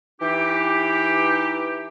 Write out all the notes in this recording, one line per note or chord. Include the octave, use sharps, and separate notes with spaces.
E3 D#4 G4